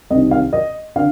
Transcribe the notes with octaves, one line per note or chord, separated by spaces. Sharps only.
C2 C3 D#3 D#5
F5
D#5
D3 F5